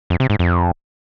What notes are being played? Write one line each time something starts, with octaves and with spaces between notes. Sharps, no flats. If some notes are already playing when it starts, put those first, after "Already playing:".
F2
C3
G#2
F2